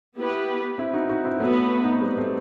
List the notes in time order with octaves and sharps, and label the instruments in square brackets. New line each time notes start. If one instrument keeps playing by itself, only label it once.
[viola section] B3 E4 G4 B4
[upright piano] C4 E4
D#4 F#4
D#4 F#4
C4 E4
[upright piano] F#3 A3 [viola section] B3 F#4 B4
[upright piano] D#4
C4
G3 B3
A3 C4